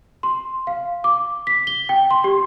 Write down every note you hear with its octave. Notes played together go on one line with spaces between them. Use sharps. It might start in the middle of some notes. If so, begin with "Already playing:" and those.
C6
F5
D6
B6
G7
G5
C6
G4